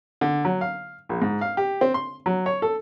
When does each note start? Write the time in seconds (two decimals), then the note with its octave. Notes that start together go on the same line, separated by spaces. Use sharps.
0.21 D3
0.45 F#3
0.61 F5
1.09 A#1
1.22 G#2
1.41 F5
1.57 G4
1.81 C4
1.94 C6
2.26 F#3
2.46 C#5
2.62 A4